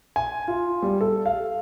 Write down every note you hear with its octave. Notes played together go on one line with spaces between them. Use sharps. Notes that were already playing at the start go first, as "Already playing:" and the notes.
G#5
F4
G3
A4
F5